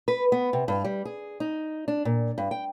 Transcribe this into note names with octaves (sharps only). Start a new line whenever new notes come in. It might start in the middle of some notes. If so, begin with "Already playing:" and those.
B4
B3
C3
G2
G3
G#4
D#4
D4
A#2
G2
G5